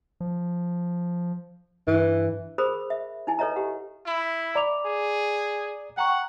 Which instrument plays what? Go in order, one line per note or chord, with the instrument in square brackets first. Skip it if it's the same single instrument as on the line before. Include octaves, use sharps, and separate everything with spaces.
[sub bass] F3
[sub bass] G2 [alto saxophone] E3
[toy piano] G#4 A#4 C5 B5 D#6
E5
D#4 E4 G#5
A4 B4 C#5 D#5 E5 A#5
G4 F#5
[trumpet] E4
[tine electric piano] D5 [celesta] A#5 D6 F7
[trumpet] G#4
[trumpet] F#5 [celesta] G5 A#5 C#6